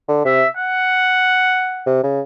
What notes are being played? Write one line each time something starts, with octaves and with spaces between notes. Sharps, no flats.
D3
C3 E5
F#5
C3
C#3